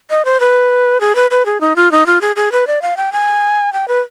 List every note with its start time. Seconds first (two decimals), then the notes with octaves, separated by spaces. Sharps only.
0.10 D#5
0.25 C5
0.40 B4
1.01 G#4
1.15 B4
1.31 B4
1.46 G#4
1.61 D#4
1.76 F4
1.92 D#4
2.06 F4
2.21 G#4
2.36 G#4
2.52 B4
2.67 D5
2.82 F5
2.97 G5
3.12 G#5
3.73 G5
3.88 B4